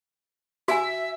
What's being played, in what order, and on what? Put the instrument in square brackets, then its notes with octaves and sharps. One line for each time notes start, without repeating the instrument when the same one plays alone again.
[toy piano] F#4 G#5 [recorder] E5